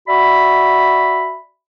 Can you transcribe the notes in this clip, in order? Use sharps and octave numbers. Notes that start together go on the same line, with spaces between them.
F#4 D5 E5 B5